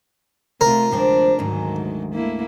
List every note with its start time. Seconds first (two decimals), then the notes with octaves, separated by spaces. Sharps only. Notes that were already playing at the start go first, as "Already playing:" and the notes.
0.61 C3 A3 F4 A#4
0.91 D2 F3 G#3 C4 D4
1.39 D2 G#2 D#3 F#3
2.14 A3 A#3 E4